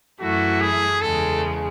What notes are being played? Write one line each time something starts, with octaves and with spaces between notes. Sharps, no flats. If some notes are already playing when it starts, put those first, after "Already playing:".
F#2 E3 A3 E4 F#4
G#4
E2 C#3 G#3 A4